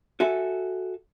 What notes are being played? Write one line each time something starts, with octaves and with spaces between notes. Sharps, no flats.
F#4 A4 E5 G#5